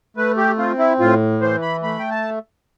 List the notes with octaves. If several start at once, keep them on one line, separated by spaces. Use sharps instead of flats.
A3 B4
G4
C4 F4
E4
A2 F4
E3 C5
B5
A3 B5
G5
A5